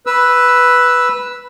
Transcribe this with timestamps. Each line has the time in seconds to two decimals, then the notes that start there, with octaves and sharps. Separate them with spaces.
0.06 B4 E6